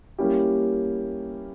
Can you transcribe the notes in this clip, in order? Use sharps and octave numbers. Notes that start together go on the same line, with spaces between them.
G3 A#3 C#4 E4 G4